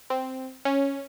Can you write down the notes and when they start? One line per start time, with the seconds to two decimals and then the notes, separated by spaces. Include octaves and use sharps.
0.10 C4
0.65 C#4